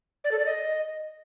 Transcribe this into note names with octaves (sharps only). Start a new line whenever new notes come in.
D5
A4
D5
D#5